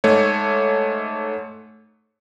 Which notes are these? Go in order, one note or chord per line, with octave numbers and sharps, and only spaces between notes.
G#2 A3 C#5